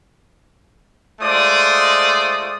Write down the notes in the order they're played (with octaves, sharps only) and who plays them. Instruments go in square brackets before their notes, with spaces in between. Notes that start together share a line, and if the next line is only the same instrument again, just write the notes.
[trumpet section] G#3 A3 F4 C5 D5 D#6